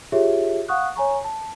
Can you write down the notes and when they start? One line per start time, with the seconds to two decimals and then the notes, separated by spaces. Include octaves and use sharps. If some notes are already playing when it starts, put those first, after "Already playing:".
0.12 F4 G4 G#4 C#5 E5
0.68 F5 F#5 C#6 D#6 F#6
0.96 C#5 G#5 A#5 C#6
1.24 A5